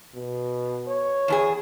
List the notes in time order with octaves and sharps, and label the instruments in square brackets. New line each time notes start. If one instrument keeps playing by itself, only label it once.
[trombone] B2
C#5
[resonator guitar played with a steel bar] E2 D4 G#4